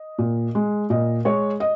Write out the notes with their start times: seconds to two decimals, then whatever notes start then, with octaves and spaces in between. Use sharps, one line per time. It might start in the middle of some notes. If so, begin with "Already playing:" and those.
Already playing: D#5
0.18 A#2
0.55 G#3
0.90 A#2 D#5
1.25 G#3 C#5
1.60 D#5